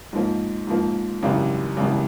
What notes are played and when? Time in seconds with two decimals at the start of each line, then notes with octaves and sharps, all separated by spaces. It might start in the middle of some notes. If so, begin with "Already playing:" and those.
0.13 G#2 F3 A#3
0.67 G#2 F3 A#3
1.23 G#1 F#2 C#3 E3 G3
1.77 G#1 F#2 C#3 E3 G3